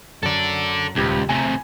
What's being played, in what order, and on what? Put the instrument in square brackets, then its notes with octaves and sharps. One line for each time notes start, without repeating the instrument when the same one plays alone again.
[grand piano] F#2 [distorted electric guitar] A4 D5
[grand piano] D#1 G4 G#6 [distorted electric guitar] C#2
[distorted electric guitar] A2 C3 [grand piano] G#5